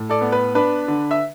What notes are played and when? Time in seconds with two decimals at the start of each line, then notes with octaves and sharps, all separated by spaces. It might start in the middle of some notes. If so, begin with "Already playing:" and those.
Already playing: A2
0.09 A4 D5
0.21 B3
0.32 B4
0.55 D4 B4
0.88 D3
1.11 E5